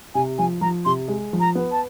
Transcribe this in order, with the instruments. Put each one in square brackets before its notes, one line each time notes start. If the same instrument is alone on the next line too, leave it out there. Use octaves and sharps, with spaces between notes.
[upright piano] C3 [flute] G#5
[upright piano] F3 [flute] G#5
[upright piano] F3 [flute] A#5
[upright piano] C3 [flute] C6
[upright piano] G#3
F3
[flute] A#5
[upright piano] B3
[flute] A5